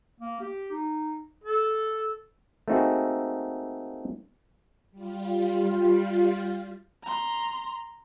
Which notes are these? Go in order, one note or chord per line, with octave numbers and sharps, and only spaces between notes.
A#3
G4
D#4
A4
A3 A#3 C4 D#4 F#4 G#4
G3 F4
A#5 C6